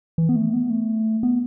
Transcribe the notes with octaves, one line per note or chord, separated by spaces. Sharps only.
E3
B3
A3
B3
A3
B3